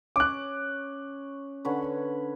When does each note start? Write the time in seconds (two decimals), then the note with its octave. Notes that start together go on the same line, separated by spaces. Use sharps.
0.16 C#4 D6 F#6
1.65 D3 C#4 B4